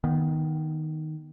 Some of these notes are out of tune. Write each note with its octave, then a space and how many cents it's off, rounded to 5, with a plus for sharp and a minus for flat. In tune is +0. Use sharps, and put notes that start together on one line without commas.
D#3 +0 B3 -20